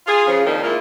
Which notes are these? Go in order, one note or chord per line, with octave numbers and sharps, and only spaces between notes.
F4 G#4
C#3 F3
F2 A#2 D#3 D#4
G#3 A#3 E4 F4